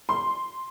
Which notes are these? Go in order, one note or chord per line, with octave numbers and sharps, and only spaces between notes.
C6